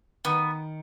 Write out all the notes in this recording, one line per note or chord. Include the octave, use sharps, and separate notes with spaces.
D#3 B3